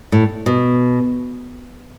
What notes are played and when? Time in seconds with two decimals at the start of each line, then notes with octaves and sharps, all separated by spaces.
0.12 A2
0.46 B2